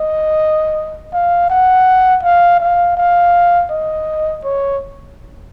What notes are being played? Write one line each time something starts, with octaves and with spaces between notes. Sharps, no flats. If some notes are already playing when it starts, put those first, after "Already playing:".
Already playing: D#5
F5
F#5
F5
F5
F5
D#5
C#5